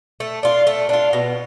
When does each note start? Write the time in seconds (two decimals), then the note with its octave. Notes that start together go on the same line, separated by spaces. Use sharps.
0.20 A3
0.43 D4 F4
0.67 A3
0.89 D4 F4
1.13 B2